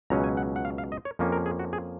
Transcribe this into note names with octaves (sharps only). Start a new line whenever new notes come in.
C#2 B2 F#3 C#4 A#5
G#5
F#5
F#5
F5
F5
D#5
C#5
F2 F3 A#3 C#4
A#4
G#4
F#4
G#4